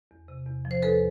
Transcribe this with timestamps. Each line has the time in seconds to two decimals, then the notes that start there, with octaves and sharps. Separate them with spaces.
0.11 E2
0.28 C3
0.46 E2
0.65 F3
0.71 C5
0.82 E2 A4 B4